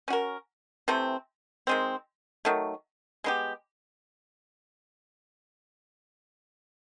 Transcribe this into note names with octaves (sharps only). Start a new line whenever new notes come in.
C#4 F#4 A#4
C3 E3 A3 C4
D#3 G#3 C4
D#3 F#3 A3
G#3 B3 D#4 G4